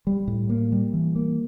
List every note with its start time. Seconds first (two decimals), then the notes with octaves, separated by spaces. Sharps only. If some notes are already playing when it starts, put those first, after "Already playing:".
0.07 G3
0.28 A2
0.49 A#3
0.72 G3
0.93 E3
1.16 A#3